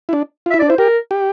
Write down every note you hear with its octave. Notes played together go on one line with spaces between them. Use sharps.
E4
D4
F4
E4 E5
D4 D5
E4 C5
G4 A#4
G4